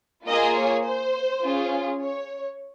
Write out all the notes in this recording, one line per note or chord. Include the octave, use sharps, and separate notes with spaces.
A#3 F4 G#4 D#5
C#5
C5
C#4 F4 G#4
C#5